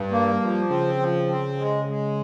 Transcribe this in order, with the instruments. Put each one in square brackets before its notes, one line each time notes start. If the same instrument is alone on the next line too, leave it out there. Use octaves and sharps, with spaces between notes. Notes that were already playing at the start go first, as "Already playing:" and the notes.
Already playing: [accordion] G2
A#3
[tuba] G3
[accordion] F3
[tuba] C#3 [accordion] C4
[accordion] F3
C4
G#3
G#3